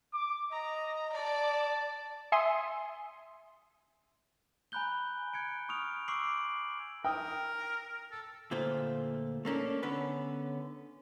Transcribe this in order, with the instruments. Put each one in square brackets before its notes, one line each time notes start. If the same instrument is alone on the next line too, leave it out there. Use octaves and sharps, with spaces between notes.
[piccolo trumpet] D6
[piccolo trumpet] D#5 [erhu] A#5
[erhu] D5 [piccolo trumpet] A5
[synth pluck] E5 G#5 C6 D#6
[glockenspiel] G#5 A#5 B5 F#6 G6 G7
F#6 G#6 C#7 D7
C#6 D#6 F6 D7 F7
C#6 D6 E6 C7 D7 F#7
[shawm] A#4 [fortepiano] G5 D#6 E6
[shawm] A4
[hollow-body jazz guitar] D2 A#2 A3 F4 C5
A3 A#3 C#4 D4
D3 B3 C#4 B4